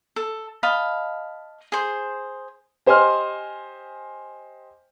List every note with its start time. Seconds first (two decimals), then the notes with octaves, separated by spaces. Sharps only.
0.16 A4
0.63 D#5 F5 A5 B5
1.72 G#4 C5
2.86 G4 C5 D#5 G#5 C6 F6